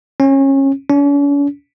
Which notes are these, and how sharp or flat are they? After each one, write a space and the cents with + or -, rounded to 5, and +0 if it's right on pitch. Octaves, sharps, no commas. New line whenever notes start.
C#4 -25
C#4 +45